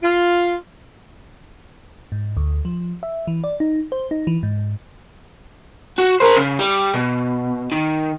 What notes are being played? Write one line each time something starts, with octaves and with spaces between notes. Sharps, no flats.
F4
G#2
D2
F3
E5
E3
D5
D#4
C5
D#4
E3
G#2
F#4
A#4 C5
C#3
G3
B2
D#3